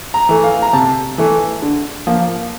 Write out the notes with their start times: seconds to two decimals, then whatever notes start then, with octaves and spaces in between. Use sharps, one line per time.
0.14 A#5
0.29 E3 A3
0.44 F5
0.62 A#5
0.73 C3 A5
1.18 E3 A3
1.62 D3
2.07 F3 A#3